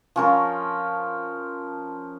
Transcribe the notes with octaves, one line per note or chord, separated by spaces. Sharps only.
F3 C#4 A#4